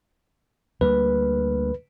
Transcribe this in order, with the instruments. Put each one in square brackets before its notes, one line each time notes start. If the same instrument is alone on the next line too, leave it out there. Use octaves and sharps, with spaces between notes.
[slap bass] D2 G3 A#3 [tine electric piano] B4